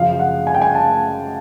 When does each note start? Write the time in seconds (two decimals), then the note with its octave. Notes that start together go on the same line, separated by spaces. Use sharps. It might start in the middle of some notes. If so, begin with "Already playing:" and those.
Already playing: F#2 C#3 F3 F5
0.19 F#5
0.47 G#5
0.54 G5
0.62 G#5
0.75 A5